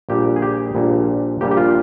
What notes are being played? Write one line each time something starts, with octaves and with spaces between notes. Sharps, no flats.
A#1 A#2 G3 G4
G#4
G4
A#1 A#2 G3
A#1 A#2 G3 G4
G4
F4